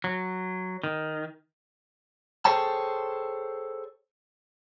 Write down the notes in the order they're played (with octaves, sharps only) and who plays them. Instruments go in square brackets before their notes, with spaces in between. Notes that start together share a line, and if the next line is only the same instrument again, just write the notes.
[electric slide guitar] F#3
D#3
[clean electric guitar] G#4 A4 C5 C#5 G5 A5